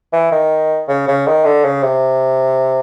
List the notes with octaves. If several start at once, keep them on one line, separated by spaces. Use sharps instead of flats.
E3
D#3
C#3
C#3
D#3
D3
C#3
C3